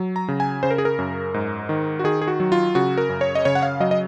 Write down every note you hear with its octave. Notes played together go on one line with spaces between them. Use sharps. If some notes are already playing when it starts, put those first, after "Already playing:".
Already playing: F#3
A#5
C#3
G#5
C#3 C5
A#4
G#4
A#4
F#2
G#2
D#3
F#4
D#3 G#4
G#4
F#4
F#3
F4
C#3 F#4
A#4
F#2
C#5
D#5
C#3 C#5
F#5
F5
F#3 D#5
D#5